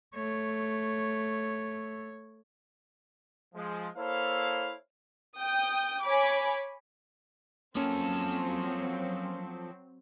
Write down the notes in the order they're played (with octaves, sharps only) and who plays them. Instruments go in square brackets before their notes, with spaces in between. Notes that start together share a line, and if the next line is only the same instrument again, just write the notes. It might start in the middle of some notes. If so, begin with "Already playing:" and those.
[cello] A3 C#5
[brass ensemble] F3 G#3
A#3 E4 A4 C5 C#5 F5
[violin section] G5 D#6 G6
C#5 G#5 B5 D6
[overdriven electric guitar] F3 A4 [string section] F#3 C4 [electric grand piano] A#3 C#4